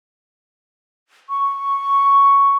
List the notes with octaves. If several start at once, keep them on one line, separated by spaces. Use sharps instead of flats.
C#6